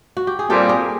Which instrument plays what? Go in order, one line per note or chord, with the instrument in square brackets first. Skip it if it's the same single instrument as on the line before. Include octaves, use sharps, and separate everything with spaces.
[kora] F#4
G4
G#4
[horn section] A#2 G3 C4 [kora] G4 A4
[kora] G#4 A#4